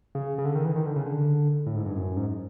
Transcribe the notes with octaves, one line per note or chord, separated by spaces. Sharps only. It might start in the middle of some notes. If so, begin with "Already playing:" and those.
C#3
C#3
D3
D#3
E3
D#3
D3
C#3
D3
A2
G#2
G2
F#2
G#2